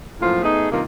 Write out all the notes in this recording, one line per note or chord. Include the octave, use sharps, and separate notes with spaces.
F#2 A2 F3 A#3 F4
A3 B3 D#4 G#4
G2 C3 D#3 A#3 F4